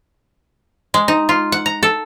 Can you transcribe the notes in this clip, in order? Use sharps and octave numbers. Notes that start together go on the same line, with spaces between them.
G#3
D#4
F4
F#5
A#5
A4